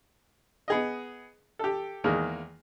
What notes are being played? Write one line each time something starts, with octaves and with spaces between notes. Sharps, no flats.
B3 G#4 D#5
G4 A4
E2 D#3 G#3 A#3